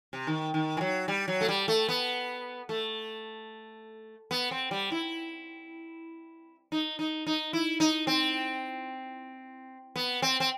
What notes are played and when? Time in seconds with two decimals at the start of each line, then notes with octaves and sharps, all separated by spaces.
0.13 C3
0.27 D#3
0.54 D#3
0.77 E3
0.81 F#3
1.08 G3
1.28 F#3
1.41 A3
1.48 G3
1.68 A3
1.89 B3
2.69 A3
4.31 B3
4.51 C4
4.71 G3
4.92 E4
6.72 D#4
6.99 D#4
7.27 D#4
7.53 E4
7.80 D#4
8.07 C4
9.96 B3
10.22 C4
10.40 C4